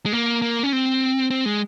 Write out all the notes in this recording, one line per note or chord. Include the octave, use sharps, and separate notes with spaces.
G#3
A#3
A#3
C#4
C4
C4
G#3